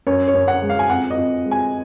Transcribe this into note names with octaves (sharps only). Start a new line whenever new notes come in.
F#2 C#5
C#5
F#2
F#5
G#3
F5
G#5
F2 F#5
D#5
F2
G#3
G#5